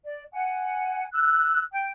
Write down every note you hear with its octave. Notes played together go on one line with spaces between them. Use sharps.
D5
F#5 G#5
E6 F#6
G5